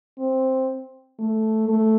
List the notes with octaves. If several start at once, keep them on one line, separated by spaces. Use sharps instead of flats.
C4
A3
A3